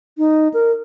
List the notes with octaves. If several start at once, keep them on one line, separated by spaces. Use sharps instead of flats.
D#4
A#4